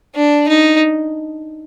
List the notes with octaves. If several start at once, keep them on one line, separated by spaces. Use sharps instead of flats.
D4
D#4